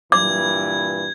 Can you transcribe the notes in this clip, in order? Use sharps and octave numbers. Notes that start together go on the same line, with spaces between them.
G2 A#2 E3 D6 G#6